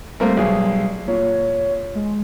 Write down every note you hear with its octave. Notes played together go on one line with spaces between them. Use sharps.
G3 A3 A#3 C4
B1 G#4
A#2 C#5
G#3